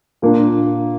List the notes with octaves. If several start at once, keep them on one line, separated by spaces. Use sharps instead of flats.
A#2 A#3 D4